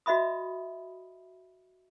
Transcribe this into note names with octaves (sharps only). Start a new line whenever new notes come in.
F#4 D#5 E5 B5 D#6